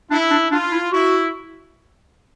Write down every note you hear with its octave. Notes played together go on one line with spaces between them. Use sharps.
D4 E4
D4
D4 F4
E4
E4 F#4